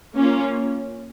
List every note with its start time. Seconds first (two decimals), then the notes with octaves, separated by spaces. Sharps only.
0.14 A#3 C#4 F4